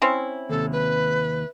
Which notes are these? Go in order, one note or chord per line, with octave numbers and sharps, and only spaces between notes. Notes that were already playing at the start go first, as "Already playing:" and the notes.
C4 C#4 E4
D#2 C3 A4
B4